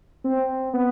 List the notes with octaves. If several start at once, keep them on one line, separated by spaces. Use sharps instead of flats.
C4
B3